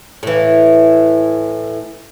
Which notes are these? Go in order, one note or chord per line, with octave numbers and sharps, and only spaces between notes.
A2 E3